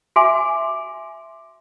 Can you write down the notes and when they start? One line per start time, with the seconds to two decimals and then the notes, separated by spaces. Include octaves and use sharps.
0.16 F#4 E5 G#5 C6 D6